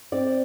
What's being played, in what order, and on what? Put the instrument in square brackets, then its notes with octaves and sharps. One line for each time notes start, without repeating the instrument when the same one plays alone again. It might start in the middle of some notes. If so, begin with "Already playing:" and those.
[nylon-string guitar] C4 D5